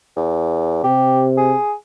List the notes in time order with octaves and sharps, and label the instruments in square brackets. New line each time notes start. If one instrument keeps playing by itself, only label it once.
[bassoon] E2
[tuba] C3 [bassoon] G4
[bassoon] G#4